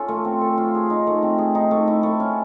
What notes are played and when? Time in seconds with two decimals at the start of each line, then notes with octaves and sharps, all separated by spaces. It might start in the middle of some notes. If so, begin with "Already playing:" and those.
Already playing: C#4 F4 A4
0.08 A3
0.25 C4
0.41 A4
0.58 F4
0.75 G#4
0.90 D#4
1.07 A3
1.23 C4
1.38 G#4
1.55 D#4
1.71 A3
1.88 E4
2.03 A3
2.20 C#4